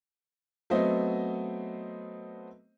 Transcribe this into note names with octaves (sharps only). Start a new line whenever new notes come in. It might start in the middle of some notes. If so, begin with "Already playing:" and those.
F#3 A3 B3 C4 C5 D#5